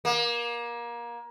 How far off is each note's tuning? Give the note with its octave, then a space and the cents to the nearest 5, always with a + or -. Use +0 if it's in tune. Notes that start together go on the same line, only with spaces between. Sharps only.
A#3 +25